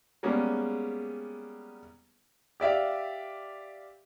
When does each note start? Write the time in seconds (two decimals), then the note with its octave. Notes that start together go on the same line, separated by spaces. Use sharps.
0.23 G3 G#3 A#3 B3 C#4 G#4
2.60 G4 D5 E5 F5